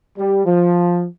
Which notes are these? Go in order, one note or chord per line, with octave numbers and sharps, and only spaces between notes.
G3
F3